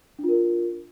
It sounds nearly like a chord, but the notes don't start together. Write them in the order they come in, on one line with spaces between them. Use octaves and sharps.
D4 F4 A#4